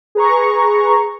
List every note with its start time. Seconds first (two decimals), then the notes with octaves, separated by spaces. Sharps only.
0.15 G#4 B4 A#5 C#6